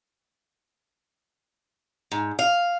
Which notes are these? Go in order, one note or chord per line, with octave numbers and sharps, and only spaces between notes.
G#2
F5